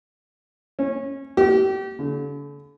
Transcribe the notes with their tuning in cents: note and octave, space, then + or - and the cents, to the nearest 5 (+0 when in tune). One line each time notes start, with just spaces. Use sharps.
C#4 -20
G4 -30
D3 -45